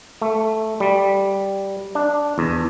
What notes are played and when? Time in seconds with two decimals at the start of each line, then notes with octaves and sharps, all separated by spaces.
0.22 A3
0.80 G3
1.95 D4
2.38 E2